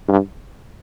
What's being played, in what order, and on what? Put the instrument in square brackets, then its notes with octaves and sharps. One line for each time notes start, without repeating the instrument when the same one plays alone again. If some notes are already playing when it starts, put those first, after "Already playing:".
[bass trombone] G2